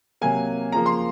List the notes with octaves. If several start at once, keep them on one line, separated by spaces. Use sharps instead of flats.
C3 F#3 A#3 G#5
C#3 F3 A#3 A#5
C6